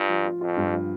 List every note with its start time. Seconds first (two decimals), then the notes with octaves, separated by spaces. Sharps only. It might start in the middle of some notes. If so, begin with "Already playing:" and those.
Already playing: G2 F4
0.09 F3
0.25 F4
0.41 F2 F4
0.57 G2
0.73 F3